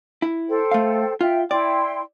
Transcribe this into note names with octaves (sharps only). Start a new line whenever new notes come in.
E4
A4 C5 G5
A3 F5
F4 E5 G5
E4 D5 G5 C6